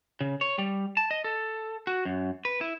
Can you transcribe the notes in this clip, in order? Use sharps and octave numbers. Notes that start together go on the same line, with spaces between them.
C#3
C#5
G3
A5
D#5
A4
F#4
F#2
B4
E4